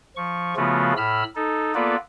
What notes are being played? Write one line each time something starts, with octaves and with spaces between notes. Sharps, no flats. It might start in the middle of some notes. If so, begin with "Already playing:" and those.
F3 C#6
C#3 F3 A3 B3 F4 F#4
A2 B5 E6 F6
D#4 A4
A#3 B3 F4 A4 B4 D5